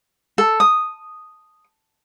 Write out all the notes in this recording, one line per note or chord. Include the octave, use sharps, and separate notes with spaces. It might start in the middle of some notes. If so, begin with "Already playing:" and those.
A4
D#6